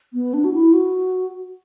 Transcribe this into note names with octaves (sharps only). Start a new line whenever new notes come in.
B3
D4
F#4
E4
F#4